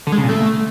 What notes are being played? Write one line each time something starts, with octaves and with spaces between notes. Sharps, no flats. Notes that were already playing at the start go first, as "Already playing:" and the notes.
D3
G#3
C#3
A#2
A3